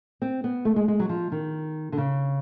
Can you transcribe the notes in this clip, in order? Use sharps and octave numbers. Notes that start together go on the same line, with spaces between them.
C4
B3
A3
G#3
G#3
F#3
F3
D#3
D3
C#3